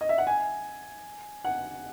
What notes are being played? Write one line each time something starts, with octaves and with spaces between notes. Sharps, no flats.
D#5
E5
F#5
G#5
F#5